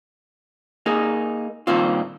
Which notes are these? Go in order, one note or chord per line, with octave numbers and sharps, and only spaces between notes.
A#3 D#4 G#4
G2 A#2 D#3 C4 F4